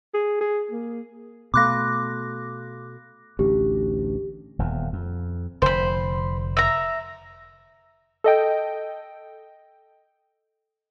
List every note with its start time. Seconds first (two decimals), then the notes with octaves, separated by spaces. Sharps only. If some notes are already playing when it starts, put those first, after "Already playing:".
0.14 G#4
0.41 G#4
0.71 A#3
1.54 B2 A3 F5 B5 C6 D6 F#6 A#6
3.39 A1 D2 G4
4.59 D#1 E2
4.93 F2
5.62 F1 D3 C5 B5
6.57 E5 A#5
8.24 A4 D#5 G5